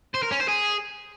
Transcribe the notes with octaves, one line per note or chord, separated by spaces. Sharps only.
C5
A#4
C#4
C5
G#4